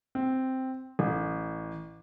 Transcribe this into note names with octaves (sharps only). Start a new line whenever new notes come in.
C4
A1